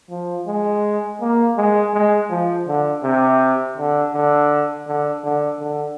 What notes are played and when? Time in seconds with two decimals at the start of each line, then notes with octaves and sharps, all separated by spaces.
0.10 F3
0.47 G#3
1.21 A#3
1.57 G#3
1.93 G#3
2.30 F3
2.67 D3
3.03 C3
3.77 D3
4.13 D3
4.87 D3
5.24 D3
5.60 D3